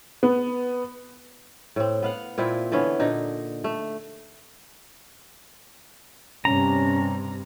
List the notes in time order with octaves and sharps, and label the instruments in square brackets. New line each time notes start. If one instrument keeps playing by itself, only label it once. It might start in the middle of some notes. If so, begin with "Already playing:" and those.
[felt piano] B3
[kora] A2 C4
B3 F5 F#5
A#2 C4 E4 F4
D3 E3 B3 C#4
A#2 D3 D#4
A3
[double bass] G2 C3 [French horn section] C#4 [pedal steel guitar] A#5